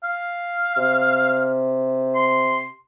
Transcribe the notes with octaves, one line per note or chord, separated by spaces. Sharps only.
F5
C3
C6